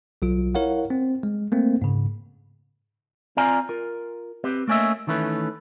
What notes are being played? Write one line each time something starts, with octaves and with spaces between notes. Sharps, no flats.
B1 F#3 F4
E4 A#4 C#5 F5 F#5
C4
G#3
A3 A#3 C4
G#2 C#3
C4 F4 D5 F5 G#5 A#5
F4 A#4
C4 G4 B4
A3 A#3 C#4 D#5 E5
D#3 E3 A3 C#4 B4